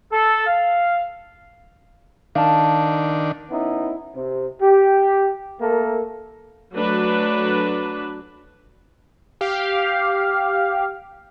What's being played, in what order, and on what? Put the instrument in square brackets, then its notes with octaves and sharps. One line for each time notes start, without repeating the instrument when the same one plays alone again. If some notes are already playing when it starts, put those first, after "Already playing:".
[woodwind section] A4
F5
[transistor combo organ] D#3 D4 [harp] F5 A5
[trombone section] B3 C#4 D#4 E4
C3
G4
A3 A#3 A4 A#4
[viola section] F#3 A3 D4 B4
[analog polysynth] G4 F5